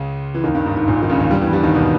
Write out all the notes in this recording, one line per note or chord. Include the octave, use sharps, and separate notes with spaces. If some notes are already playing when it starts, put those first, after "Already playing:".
Already playing: C#2 C#3
E3
D#2 D#3
G2
G#2
G#2
A#1 A#2
D#3
C#2 C#3
D#2 D#3
G2 G3
E2 E3
G2 G3
D#2 D#3
B2